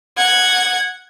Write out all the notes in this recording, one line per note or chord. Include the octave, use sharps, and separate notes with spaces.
F#5 G#6